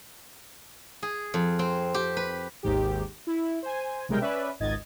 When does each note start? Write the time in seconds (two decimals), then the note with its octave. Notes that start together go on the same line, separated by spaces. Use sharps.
1.03 G#4
1.34 F2
1.59 C4
1.94 G4
2.17 B4
2.63 G#1 D#2 G#2 D#3 G4
3.27 E4
3.63 C5 G#5
4.09 B1 C3 G3 G#3 A#4 G5
4.21 C#4 B4 D5 E5
4.60 G#1 C#2 G#2 D#5 G#6 A6